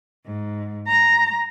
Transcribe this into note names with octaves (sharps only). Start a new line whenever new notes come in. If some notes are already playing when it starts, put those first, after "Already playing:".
G#2
A#5